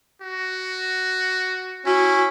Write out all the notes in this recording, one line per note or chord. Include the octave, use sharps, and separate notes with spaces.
F#4
C#4 E4 F#4